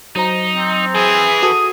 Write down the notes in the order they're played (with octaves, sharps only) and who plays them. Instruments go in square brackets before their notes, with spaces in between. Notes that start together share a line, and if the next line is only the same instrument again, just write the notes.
[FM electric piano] F#3 C5 A#5 [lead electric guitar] D#4
[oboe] C4
[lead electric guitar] E3 [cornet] G#4
[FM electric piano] F#4 A4 [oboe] D#6